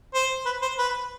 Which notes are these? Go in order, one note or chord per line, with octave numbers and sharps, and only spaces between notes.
C5
B4
C5
B4